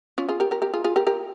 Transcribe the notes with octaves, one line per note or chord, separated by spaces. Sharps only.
C#4 F4
F4 G#4
G4 A#4
G4 A#4
G4 A#4
F4 G#4
F4 G#4
G4 A#4
G4 A#4